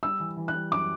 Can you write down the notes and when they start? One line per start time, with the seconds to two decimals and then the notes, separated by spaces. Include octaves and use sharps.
0.03 G3 E6
0.20 E3
0.37 E3
0.48 F#6
0.54 G3
0.71 F#2 D6